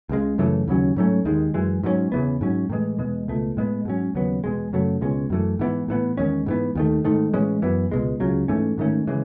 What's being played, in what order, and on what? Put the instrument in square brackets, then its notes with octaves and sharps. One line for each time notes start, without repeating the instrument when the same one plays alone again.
[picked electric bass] C#2 C#3 G#3
F#2 C#3 E3 A3
D#2 C#3 F#3 C#4
G#2 F#3 A3 C#4
D#2 D#3 G#3
F#2 E3 G#3
G#2 F#3 A3 C#4
E2 C#3 E3 B3
G#2 F#3 C#4
A2 E3 G#3
E2 B2 G#3
C#2 B2 A3
A2 G#3 B3
G#2 F#3 C#4
D#2 C#3 F#3 B3
E2 B2 G#3
F#2 C#3 F#3 A3
C#2 B2 G#3 C#4
F#2 E3 A3
G#2 E3 B3
A2 E3 B3
E2 D#3 G#3 C#4
G#2 E3 B3
D#2 D#3 A3
G#2 D#3 A3
A2 E3 G#3 C#4
F#2 E3 B3
C#2 B2 G#3
C#2 C#3 F#3
G#2 E3 A3 C#4
G#2 D#3 A3 C#4
C#3 E3 G#3